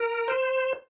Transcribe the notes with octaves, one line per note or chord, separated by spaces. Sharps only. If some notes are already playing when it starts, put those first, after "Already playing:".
Already playing: A#4
C5